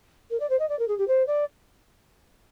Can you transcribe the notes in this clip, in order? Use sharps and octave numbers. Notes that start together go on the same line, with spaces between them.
A#4
D5
C5
D#5
D5
A#4
G#4
G4
C5
D5